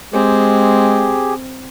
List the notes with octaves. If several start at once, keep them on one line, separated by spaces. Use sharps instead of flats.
G#3 C4 G4 G#4